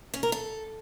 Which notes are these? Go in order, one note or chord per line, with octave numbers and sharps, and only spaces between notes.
C#4
A#4
A4